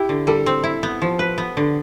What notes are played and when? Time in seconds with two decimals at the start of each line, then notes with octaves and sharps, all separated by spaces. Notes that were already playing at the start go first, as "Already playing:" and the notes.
Already playing: E4 G4
0.09 D3
0.27 G3 A4
0.46 C4
0.64 E4
0.83 B3
1.02 F3
1.19 B4
1.38 B3
1.57 D3